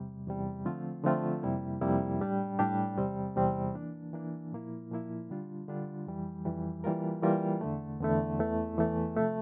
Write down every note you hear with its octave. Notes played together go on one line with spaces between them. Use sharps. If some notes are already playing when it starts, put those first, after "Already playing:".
Already playing: E2 C3 G3
E2 C3 G3
D3 F3 A3 C4 F4
D3 F3 A3 C4 F4
F2 C3 G3 A#3 E4
F2 C3 G3 A#3 E4
A2 G3 D4 G4
A2 G3 D4 G4
E2 C3 G3 C4
E2 C3 G3 C4
E3 A#3 D4
E3 A#3 D4
A#2 F3 A#3 E4
A#2 F3 A#3 E4
D3 G3 D4 F4
D3 G3 D4 F4
F2 E3 G3
F2 E3 G3
E3 G3 A#3 F4 A#4
E3 G3 A#3 F4 A#4
E2 D3 A3
E2 D3 A3
E2 E3 A3
E2 E3 A3
C3 F3 A3